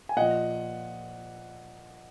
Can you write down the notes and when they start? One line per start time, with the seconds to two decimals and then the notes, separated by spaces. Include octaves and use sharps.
0.09 G#5
0.16 A#2 F3 D#5 F#5